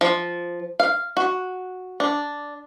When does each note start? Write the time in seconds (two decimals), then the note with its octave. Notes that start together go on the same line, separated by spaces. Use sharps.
0.01 F3
0.80 F5
1.17 F#4
2.00 D4